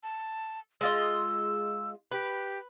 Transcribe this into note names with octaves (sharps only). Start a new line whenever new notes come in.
A5
G#3 F4 D#5 E6
G4 B4